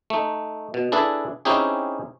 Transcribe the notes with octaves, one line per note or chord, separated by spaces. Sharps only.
A3 D#4
B2
D4 E4 G#4 A4 B4
C4 C#4 D#4 E4 G4 G#4